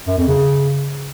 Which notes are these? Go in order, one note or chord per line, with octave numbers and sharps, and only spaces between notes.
F#2
F2
C#3